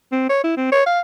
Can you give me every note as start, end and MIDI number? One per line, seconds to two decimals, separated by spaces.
0.12 0.26 60
0.29 0.40 73
0.44 0.56 64
0.57 0.68 60
0.72 0.83 73
0.86 1.00 77